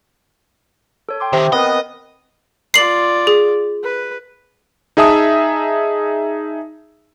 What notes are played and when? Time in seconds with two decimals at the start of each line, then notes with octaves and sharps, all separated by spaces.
1.09 A4 C#5
1.20 G5 C6 D6
1.33 C3 D#3 G5
1.52 B3 C4 A#4 B4 D#5
2.74 F4 D5 C7 F#7
3.27 G#4
3.83 B4
4.97 D#4 G#4 E5 A5 D#6